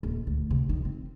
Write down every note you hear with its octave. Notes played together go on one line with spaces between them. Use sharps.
D#1
D2
C3
D#3
C4